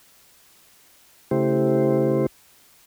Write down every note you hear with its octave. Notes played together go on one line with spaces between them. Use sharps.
C#3 A3 E4 G4 C5